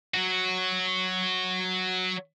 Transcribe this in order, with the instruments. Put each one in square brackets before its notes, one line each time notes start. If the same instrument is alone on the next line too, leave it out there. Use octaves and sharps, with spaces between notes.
[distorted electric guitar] F#3 F#4